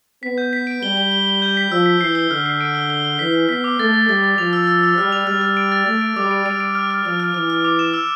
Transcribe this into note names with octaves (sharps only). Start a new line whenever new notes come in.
B3 B6
G6
B6
D7
G3 G7
G7
G7
G7
G6
B6
F3 E6
B6
E3 C7
G7
D3 F6
C7
D7
G7
G7
G7
E3 B6
B6
B3 B6
D6
A3 A6
A6
G3 A6
A6
F3 F7
E6
E6
E6
G3 F6
F7
G3 F6
F6
D7
A6
A3 A6
D7
G3 D6
D7
G3 D7
D7
F6
F6
F3 F6
F6
E3 F6
F6
D6
E7
E6